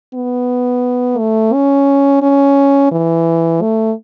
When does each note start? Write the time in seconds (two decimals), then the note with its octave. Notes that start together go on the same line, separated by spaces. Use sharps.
0.14 B3
1.19 A3
1.53 C#4
2.22 C#4
2.92 E3
3.62 A3